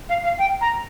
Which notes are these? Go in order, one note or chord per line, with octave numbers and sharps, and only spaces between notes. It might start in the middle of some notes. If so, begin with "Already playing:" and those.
F5
F5
G5
A#5